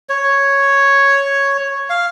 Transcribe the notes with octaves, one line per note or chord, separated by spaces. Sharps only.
C#5
F5